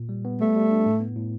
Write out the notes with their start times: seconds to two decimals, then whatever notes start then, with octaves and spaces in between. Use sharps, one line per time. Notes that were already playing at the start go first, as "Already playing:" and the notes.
Already playing: A#2
0.09 G3
0.25 B3
0.41 G3 A3
0.56 G3
0.71 D4
0.86 A2
1.00 B3
1.16 A2